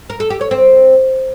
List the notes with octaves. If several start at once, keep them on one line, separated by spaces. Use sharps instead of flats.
A#4
A4
G4
C#5
C4